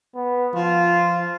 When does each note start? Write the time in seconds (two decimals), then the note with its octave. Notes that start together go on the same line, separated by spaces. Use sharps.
0.15 B3
0.55 F3 F4